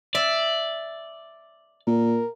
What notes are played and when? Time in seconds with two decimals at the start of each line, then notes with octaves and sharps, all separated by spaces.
0.15 D5 E5
1.87 A#2 A#4